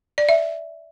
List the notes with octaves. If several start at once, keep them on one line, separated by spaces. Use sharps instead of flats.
D5
E5